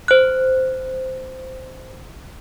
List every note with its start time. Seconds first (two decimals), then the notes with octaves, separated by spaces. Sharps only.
0.08 C5 F#6